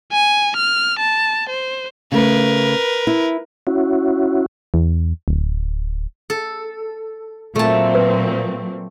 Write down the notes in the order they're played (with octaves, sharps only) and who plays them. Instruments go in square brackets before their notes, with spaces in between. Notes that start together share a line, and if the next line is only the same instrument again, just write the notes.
[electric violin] G#5
F6
A5
C5
[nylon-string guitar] C#3 A3 [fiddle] A#4 B4
[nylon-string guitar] E4
[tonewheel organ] C#4 E4 F#4
[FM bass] E2
D1
[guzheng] A4
[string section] A#2 F#3 C4 [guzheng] A3 A5
[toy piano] B4